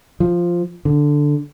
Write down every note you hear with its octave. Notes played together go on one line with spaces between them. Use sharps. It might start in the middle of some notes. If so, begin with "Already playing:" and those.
F3
D3